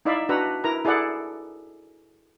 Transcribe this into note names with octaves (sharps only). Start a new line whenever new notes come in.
D#4 E4 D5 E5 F5 B5
D4 F#4 B4 F#5 A#5 E6
E4 A#4 B4 A#5
E4 G#4 A4 D5 F#5